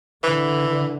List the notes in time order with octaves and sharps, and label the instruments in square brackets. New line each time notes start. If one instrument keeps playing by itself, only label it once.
[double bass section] D3 [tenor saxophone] E3